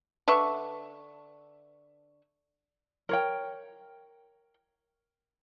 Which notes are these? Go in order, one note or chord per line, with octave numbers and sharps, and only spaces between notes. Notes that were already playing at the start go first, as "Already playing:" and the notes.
D3 B4 E5 C#6
A#4 C#5 G5